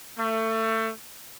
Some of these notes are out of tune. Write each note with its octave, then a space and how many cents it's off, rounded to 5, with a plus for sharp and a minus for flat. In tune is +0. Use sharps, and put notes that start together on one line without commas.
A3 +25